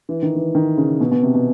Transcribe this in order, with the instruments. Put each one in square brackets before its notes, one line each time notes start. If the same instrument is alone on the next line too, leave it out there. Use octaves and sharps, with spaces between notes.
[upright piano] E3
D#3
E3
D#3
C#3
B2
B2
C3
B2